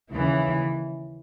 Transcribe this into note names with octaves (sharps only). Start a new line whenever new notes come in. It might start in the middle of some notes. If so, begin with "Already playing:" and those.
D#2 C#3 E3